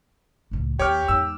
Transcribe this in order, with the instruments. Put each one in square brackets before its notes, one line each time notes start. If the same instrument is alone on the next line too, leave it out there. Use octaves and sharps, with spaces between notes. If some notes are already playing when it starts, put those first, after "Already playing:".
[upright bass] C#2 A2
[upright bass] D#2 [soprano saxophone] G4 [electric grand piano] C#5 D6 F6
[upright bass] E2 G#2 [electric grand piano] E6